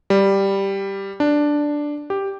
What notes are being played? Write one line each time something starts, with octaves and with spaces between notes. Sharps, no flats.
G3
D4
G4